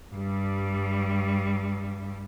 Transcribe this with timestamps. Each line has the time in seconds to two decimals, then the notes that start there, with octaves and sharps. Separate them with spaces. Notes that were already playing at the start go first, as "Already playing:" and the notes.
0.14 G2 G3